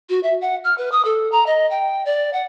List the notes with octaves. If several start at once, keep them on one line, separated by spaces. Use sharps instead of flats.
F#4
E5
F#5
F6
B4
D#6
A4
A#5
D#5
G5
D5
F#5